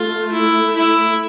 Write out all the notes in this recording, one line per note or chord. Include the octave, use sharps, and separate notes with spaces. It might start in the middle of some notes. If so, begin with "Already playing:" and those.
Already playing: A3 F4
E4
E4